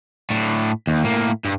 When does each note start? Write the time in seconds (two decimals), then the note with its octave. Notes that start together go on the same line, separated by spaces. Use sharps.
0.30 A2 D4
0.87 D#2
1.04 A2 A#3
1.45 G2